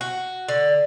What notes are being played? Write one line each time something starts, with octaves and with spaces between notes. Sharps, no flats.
F#4
D3